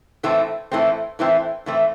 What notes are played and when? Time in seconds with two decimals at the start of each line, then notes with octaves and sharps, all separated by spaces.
0.23 A2 E3 A3 C4
0.72 A2 E3 A3 C4
1.19 A2 E3 A3 C4
1.66 A2 E3 A3 C4